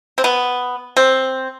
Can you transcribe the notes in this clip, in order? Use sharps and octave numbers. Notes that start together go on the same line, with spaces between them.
C4
B3
C4